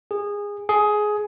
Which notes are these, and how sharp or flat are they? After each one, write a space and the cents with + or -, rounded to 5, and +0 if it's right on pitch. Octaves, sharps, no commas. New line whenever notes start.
G#4 -20
G#4 +15